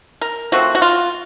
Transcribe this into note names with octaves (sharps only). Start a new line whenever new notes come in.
A#4
F3 A3 C4 F#4
F#4
F4